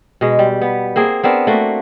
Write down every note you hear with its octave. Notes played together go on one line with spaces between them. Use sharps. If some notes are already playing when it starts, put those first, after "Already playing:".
B2 G#3
G3
B3
A#3 C4 G#4
B3 C4 D4 A#4
A3 A#3 F#4